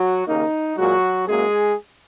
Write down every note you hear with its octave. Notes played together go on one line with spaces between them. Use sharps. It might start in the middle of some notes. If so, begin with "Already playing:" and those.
Already playing: F#3 F#4
D#2 C#3 A#3 D#4
A#2 F#3 G#3 F#4
F#2 F#3 G#3 A#3 G#4